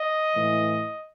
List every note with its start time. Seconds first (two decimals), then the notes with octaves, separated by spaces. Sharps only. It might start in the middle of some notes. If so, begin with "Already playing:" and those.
Already playing: D#5
0.36 A2 E3